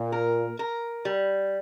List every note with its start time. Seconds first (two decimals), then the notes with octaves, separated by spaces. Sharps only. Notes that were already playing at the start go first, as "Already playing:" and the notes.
Already playing: A#2
0.12 A#4
0.59 A#4
1.05 G3